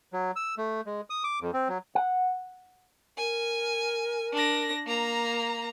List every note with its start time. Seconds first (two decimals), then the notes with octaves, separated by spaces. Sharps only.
0.13 F#3
0.36 E6
0.58 A3
0.86 G#3
1.10 D#6
1.24 D6
1.41 F2
1.53 C4
1.68 F#3
1.95 F#5
3.17 A#4 G#5
4.33 D4 A#6
4.86 A#3 A#5